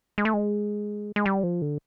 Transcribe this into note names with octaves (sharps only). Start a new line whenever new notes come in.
G#3
A3
G#3
G#3
G3
F3
D3